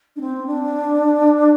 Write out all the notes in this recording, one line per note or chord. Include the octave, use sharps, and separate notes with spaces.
D4
C4
D4